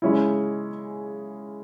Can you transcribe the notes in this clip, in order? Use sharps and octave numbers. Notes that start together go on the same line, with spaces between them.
C#3 G#3 C#4 E4